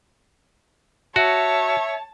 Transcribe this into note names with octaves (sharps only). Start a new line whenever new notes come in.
F#4 C#5 E5 A5